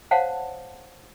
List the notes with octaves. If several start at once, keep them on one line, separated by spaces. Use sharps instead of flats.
C5 C#5 F5 F#5 A5